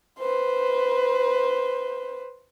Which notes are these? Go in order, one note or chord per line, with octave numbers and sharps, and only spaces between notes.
B4 C5